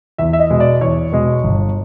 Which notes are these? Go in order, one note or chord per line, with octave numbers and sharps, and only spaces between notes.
E2 E5
E5
D#5
B2 G#3
D5
E2 C#5
B2 G#3
G1